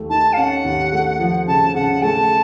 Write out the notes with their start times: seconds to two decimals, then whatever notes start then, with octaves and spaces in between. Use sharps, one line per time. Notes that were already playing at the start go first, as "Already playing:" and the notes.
Already playing: D#2 A3
0.09 D#3 A5
0.33 F5
0.37 C#4 F#5
0.64 D#2
0.92 A3
1.19 F3
1.47 C#3 A5
1.75 C#3 F#5
2.02 A3 A5